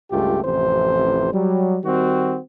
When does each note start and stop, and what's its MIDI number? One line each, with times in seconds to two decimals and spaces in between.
0.11 0.42 37
0.11 0.42 43
0.11 0.42 57
0.11 0.42 65
0.11 0.42 67
0.43 1.29 33
0.43 1.29 41
0.43 1.29 48
0.43 1.29 52
0.43 1.29 72
1.33 1.78 54
1.33 1.78 55
1.83 2.38 51
1.83 2.38 55
1.83 2.38 60
1.83 2.38 66